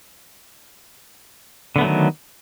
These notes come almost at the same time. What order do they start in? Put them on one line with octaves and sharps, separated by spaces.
D3 B3 A3 F#3 D#3